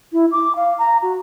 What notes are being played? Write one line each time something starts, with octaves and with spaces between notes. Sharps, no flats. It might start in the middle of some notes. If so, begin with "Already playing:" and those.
E4
D6
F5
A#5
F#4